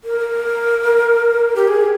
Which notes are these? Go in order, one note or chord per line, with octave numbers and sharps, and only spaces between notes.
A#4
G4
G#4